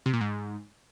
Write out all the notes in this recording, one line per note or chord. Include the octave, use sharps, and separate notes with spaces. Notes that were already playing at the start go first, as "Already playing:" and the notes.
C3
A#2
G#2